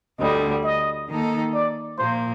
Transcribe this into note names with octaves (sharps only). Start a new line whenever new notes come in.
D2 D3 G3 D#5
D#5
D#3 A#3 D#4 A4
D5
A#2 F3 A#3 C5